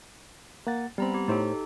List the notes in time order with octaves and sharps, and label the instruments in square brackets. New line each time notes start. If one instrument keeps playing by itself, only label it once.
[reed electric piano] A#3 F#5 A6
[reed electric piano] G3 C4 [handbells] B3 A#5 B5
[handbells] G4
[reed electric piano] A2 C5 C#5 [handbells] D#4 G4 A4